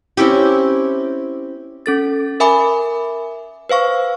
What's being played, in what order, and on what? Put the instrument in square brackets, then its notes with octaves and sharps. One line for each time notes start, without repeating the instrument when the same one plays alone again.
[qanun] C4 C#4 E4 G4
[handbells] C#4 A4 A6
A#4 E5 G#5 B5 D6
B4 C5 F5 C#6